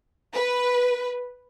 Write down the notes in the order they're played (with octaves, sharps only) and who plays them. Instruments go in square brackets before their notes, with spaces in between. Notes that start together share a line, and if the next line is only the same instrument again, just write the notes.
[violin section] B4